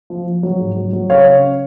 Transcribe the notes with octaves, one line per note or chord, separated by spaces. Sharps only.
F3
F3
F#3
G#2
F#3
F#3
C#3 C#5 F5
C#3